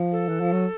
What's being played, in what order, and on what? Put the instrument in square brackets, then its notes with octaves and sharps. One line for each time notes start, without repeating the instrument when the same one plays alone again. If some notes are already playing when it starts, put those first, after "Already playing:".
Already playing: [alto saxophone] F3
[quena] A4
[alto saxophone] E3
F3
F#3